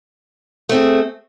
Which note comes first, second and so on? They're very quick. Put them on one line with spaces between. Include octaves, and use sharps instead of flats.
A3 C4 G#4